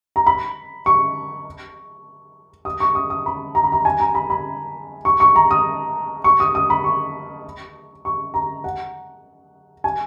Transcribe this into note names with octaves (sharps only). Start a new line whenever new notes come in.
A#5
B5
C#6
D#6
C#6
D#6
D#6
B5
A#5
B5
A#5
G#5
A#5
B5
B5
C#6
C#6
A#5
D#6
C#6
D#6
D#6
B5
C#6
C#6
A#5
F#5
G#5